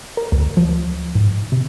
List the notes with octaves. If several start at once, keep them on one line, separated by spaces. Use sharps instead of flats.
A#4
D2
F3
G#2
C3